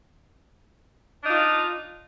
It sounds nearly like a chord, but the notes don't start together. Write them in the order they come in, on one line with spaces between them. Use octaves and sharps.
D4 D#4 F4